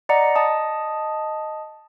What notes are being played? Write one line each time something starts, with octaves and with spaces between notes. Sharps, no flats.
D5 D#5 F#5 A#5 C#7
D#5 A5 D#6